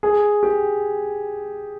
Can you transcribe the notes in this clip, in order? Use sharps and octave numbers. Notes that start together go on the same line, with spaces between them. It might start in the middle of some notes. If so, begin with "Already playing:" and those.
G#4
G4